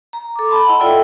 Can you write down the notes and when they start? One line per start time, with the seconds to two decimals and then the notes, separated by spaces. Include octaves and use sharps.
0.13 A#5
0.36 A4 D6
0.49 A5 B5 C6
0.66 E4 D#5 F#5
0.79 F4 A4 D5 E5 G5 E6